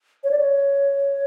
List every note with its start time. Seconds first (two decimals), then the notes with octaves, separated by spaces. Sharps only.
0.24 C#5
0.31 D5
0.39 C#5